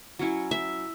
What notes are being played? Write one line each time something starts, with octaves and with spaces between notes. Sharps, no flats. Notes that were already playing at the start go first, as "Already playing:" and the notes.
F#3 C#4 E4
E5